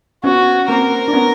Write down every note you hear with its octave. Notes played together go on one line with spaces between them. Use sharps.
B3 C#4 F#4
A#3 C4 A#4
D4
B3 C#4